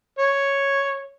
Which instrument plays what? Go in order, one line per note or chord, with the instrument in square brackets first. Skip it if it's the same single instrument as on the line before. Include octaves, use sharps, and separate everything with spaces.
[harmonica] C#5